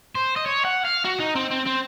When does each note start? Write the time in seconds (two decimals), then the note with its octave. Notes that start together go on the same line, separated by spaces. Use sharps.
0.15 C5
0.36 D#5
0.46 C#5
0.65 F#5
0.85 F5
1.05 F#4
1.20 D#4
1.35 C4
1.50 C4
1.65 C4